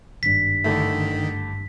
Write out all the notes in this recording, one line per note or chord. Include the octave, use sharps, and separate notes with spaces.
G#1 G2 B6
D3 D#3 A3 E4